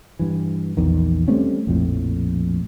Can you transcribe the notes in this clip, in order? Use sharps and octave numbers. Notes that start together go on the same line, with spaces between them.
G2 E3
A#1 E2 D#3
G3 A3 C4 C#4
A#1 F2 A2